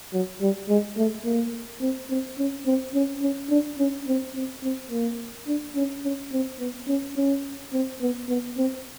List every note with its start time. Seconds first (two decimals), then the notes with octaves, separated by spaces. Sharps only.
0.13 F#3
0.41 G3
0.69 G#3
0.97 A3
1.25 A#3
1.81 C4
2.10 C4
2.38 C#4
2.66 C4
2.95 C#4
3.22 C#4
3.50 D4
3.78 C#4
4.07 C4
4.36 C4
4.63 C4
4.91 A#3
5.47 D4
5.76 C#4
6.04 C#4
6.32 C4
6.59 B3
6.88 C#4
7.17 C#4
7.73 C4
8.01 B3
8.29 B3
8.58 C4